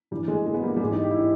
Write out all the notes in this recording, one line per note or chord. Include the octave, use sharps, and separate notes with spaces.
G2 E3 G3
G#3
G#3
B3
G3 A#3
G3
G#2 E3 G#3
D#4 G4
G4
E4
D#4